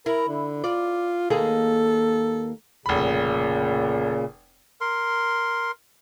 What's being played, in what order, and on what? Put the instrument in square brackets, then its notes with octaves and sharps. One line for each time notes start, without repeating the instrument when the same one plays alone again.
[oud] E4 [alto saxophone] A#4
[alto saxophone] D3
[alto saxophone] F4 [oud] D5
[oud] D#2 A#3 G#4 [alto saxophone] A4
[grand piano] F1 B5 [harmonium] A#2 C#3
[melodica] A#4 C6